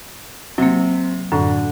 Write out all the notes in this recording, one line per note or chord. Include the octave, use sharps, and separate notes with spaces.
C3 F#3 A#3
F#2 A2 D3